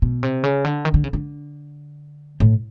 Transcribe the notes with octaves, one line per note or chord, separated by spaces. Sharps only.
B2
C3
C#3
D3
D#3
D3
C#3
D3
A2